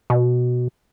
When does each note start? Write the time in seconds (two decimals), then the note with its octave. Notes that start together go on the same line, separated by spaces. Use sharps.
0.10 B2